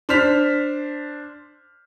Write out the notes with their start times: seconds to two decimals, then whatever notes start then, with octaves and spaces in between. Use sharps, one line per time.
0.09 D4 C5 F6 B6 F7